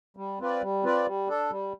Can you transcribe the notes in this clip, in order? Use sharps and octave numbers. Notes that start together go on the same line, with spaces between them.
G3
C4 F4 B4 D5
G3
C4 F4 B4 D5
G3
D4 A4
G3